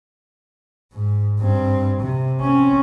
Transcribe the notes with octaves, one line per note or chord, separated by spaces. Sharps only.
G#2
G2 C4
C3
C4 C#4